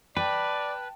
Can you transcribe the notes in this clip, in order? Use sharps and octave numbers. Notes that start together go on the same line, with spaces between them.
B4 D5 G5 A5